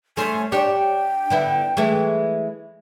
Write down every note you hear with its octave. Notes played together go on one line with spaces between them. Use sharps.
A3 C#4 C5 G#5
D4 G4 C#5 G5
D3 B3 E4
E3 G#3 A3